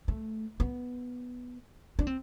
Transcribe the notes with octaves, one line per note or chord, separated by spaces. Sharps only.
A3
B3
D4
C4